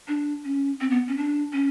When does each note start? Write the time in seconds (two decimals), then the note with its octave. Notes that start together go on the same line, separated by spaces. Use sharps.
0.08 D4
0.45 C#4
0.81 C4
0.91 B3
1.08 C#4
1.17 D4
1.53 C#4